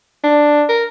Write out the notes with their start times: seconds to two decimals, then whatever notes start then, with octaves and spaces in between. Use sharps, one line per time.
0.24 D4
0.69 A#4